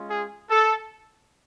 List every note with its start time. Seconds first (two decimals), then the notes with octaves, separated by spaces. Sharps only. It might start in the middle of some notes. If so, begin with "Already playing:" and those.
Already playing: G#3 C#4 F4
0.10 G#4
0.50 A4